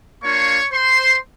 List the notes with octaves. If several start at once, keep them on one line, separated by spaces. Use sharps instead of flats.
A#3 D4 F4 C#5 C#6
C5 C6